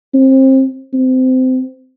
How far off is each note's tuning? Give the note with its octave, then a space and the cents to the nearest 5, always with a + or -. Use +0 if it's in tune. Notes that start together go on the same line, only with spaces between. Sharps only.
C4 +25
C4 -25